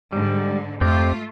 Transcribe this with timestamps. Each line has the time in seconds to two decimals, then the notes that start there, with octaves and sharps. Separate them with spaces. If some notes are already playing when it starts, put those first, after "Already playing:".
0.12 G#2 D3 G3
0.81 F2 A3 C4 F4 G4